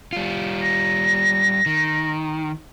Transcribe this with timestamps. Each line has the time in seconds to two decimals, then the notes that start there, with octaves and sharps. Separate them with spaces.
0.13 G3 F4
0.62 A#6
1.66 D#3